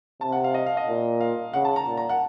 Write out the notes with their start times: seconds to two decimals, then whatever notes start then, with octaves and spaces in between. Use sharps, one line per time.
0.21 C3 A5
0.32 F#5
0.44 F5
0.54 D#5
0.66 F5
0.77 D#5
0.88 A#2
1.20 F5
1.53 C#3 F#5
1.65 A5
1.76 A#5
1.87 A#2
1.97 A#5
2.09 F#5